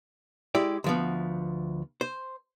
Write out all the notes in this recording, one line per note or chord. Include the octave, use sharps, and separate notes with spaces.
G#3 E4 G4 D5
D2 F3 B3
C5